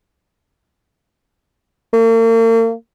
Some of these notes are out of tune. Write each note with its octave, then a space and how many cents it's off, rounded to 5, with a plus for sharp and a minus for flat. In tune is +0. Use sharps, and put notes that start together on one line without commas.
A#3 -40